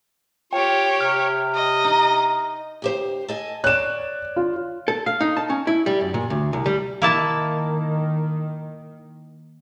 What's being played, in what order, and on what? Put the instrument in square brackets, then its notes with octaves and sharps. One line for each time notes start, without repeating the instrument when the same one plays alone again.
[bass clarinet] F4 [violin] G4 C#5 [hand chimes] G5
[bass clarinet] C3 [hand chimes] F6
[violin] D#5
[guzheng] D#4
[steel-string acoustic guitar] D2 G4 C5
A4 D#5 G#5
[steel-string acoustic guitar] C#5 D5 [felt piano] F#6 E7
[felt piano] F4
[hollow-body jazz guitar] A4
F5
D#4
A5
C#4
E4
G3
F#2
A#2
D2
C2
G3
[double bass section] D#3 [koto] A#3 E4 A5